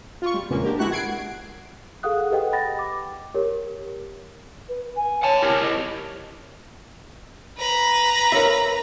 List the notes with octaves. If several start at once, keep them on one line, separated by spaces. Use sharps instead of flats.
F4 C#6
G3
E2 A#2 C#3 G#3 A#3 B3
D4 G4 A#4
G#3 E4 F#4 C#6 F#6
F#5 G#6 C7 D7
G#4 A4 F5 F#5 D#6 F#6
G4 A4 B4 D#5 F#5 G5
G5 B5 A6 A#6
D6
G4 A#4 C#5
B4
G#5
C#5 F#5 A5
E4 G4 A#4
D#5
B4 A#5
A#4 C#5 E5